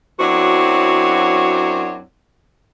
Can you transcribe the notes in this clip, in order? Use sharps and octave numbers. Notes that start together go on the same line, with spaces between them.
F#2 F#3 C4 D4 E4 F#4